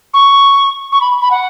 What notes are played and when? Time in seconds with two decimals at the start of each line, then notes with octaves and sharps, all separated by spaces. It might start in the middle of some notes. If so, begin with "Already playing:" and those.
0.13 C#6
0.92 C#6
1.01 B5
1.21 B5
1.30 F#5